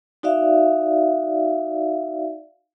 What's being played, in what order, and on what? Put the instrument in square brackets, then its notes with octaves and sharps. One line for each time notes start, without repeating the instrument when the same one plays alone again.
[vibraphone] D#4 F#4 D5 E5 F5